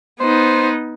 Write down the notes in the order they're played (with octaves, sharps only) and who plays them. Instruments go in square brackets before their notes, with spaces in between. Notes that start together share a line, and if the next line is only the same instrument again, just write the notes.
[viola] B3 D#4 [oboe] C5